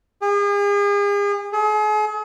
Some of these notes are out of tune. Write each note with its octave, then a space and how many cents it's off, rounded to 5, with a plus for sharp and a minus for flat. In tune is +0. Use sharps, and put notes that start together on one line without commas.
G#4 -40
G#4 +40